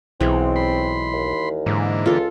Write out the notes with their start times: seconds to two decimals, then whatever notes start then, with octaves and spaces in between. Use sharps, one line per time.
0.20 B1 E3 G#3 C4
0.56 B5 C6
1.13 D#2
1.66 G#2 D3 E3 A#3
2.06 C#2 F4 A4